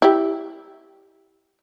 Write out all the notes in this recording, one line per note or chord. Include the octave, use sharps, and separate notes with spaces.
E4 G4